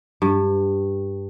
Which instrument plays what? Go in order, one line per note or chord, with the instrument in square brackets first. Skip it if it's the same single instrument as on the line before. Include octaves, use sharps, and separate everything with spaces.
[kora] G2